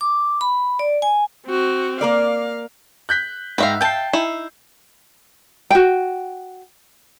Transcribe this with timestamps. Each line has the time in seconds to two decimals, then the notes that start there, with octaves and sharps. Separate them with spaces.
0.01 D6
0.41 B5
0.79 D5
1.02 G#5
1.47 C4 F#4
2.01 A#3 A#4 D5 F5
3.09 F#6 G6 B6
3.58 G#2 B4 E5 F5 G5 A#5
3.81 G5 A5 G6 C7
4.13 D#4 E4
5.70 F#4 G5